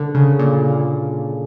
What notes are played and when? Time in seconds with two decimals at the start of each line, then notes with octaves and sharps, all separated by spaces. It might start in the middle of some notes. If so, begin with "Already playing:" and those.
Already playing: D3
0.15 C#3
0.39 A#2